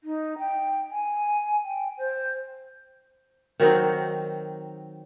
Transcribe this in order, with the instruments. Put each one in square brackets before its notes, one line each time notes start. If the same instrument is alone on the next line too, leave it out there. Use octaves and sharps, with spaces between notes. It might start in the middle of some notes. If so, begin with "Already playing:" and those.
[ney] D#4
G5
G#5
G5
C5
[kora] D#3 F#3 C4 D#4